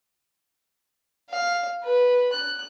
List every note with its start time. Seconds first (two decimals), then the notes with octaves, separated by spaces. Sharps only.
1.30 F5
1.84 B4
2.32 F#6